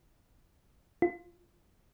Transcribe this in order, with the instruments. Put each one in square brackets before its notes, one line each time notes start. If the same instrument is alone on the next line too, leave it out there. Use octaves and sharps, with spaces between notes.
[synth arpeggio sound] F4